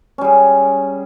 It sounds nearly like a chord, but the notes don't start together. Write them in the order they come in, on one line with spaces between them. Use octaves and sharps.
C#4 G3 G#4